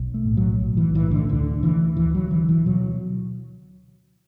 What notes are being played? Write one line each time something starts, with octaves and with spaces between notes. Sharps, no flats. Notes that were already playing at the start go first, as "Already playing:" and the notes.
Already playing: B1
A3
A2
F#3
B1
E3
A2 E3
D3
D2 D3
D3 E3
D2 E3
F#3
D3 E3
E3
B2 F#3